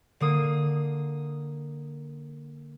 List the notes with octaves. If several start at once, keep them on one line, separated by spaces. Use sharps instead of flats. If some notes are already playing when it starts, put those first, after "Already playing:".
D3 A#3 D#6